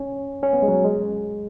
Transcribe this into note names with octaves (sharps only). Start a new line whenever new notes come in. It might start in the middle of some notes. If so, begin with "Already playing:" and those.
Already playing: C#4
C#4
B3
G#3
F#3
G#3